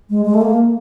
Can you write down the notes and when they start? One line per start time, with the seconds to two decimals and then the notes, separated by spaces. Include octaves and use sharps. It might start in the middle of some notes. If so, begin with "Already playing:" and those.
0.09 G#3
0.25 G#3
0.34 A3
0.41 A#3